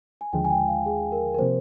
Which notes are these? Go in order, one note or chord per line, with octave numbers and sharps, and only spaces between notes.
G#5
D#2 D3 F3 G#3 G5
G#5
G5
F5
G#4
A#4
A#4
C3 F3 A#3 C5